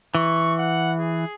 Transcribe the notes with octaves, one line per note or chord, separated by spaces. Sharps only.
E3 C#6
F#5
G#4